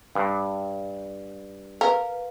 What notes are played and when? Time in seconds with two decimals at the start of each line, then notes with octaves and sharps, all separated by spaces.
0.15 G2
1.81 A#4 B4 F5